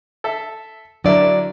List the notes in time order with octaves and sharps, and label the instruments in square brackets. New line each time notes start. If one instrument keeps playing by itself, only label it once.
[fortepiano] A4 E5
[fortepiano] D3 E4 A#4 [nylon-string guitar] F#3 D5